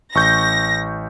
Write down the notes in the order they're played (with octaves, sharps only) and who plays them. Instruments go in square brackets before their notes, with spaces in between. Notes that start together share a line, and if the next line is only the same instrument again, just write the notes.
[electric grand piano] A1 C#6 G6 [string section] A#6